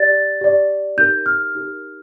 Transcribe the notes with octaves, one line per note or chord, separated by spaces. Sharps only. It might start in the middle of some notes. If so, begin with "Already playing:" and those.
Already playing: G4 D5 A6
G4 D5
D#4 G4 A#4 G6
F6
D#4 G4 A#4